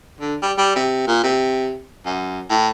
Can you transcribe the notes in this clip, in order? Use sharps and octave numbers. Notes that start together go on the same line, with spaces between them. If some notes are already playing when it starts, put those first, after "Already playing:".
D3
G3
G3
C3
A#2
C3
F#2
A2